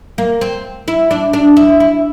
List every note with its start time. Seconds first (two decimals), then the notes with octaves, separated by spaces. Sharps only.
0.18 A#3
0.41 C4
0.88 E4
1.11 D4
1.33 D4
1.57 E4
1.80 E4